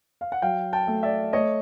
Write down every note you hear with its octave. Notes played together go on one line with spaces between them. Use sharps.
F5
F#5
F#3 F5 G5
G5 A5
A3
D5 E5
A3 C#5 D#5